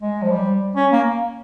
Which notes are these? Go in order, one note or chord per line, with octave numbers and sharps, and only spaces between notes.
G#3
F3
G3
C#4
A#3